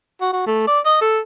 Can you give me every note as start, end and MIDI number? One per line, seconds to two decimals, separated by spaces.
0.21 0.32 66
0.33 0.47 66
0.47 0.65 57
0.67 0.79 74
0.86 0.97 75
1.01 1.19 69